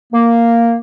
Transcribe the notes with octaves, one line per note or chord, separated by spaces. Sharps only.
A#3